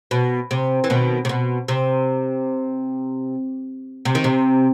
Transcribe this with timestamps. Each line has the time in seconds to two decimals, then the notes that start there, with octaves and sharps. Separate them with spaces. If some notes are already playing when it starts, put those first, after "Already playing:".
0.11 B2
0.51 C3
0.84 E3
0.90 B2 D#3
1.25 C3
1.29 B2
1.68 C3
4.05 C3
4.15 D#3
4.24 C3